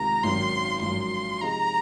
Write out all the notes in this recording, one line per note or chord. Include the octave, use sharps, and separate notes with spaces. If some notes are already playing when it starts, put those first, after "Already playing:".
Already playing: C#2 C3 D#3 A#5
G#1 F#2 D#3 F#3 C4 C6
G#1 F#2 F3 C6
C3 F3 G#3 D#4 G#4 A#5